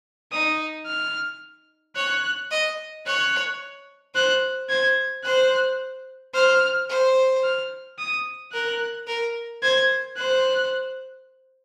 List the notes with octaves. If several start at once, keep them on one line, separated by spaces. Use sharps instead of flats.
D#4 D#6
F6
C#5 F#6
D#5
C#5 F#6
C5 F#6
C5 G#6
C5 F#6
C5 F6
C5
F6
D#6
A#4 F#6
A#4
C5 G#6
C5 F#6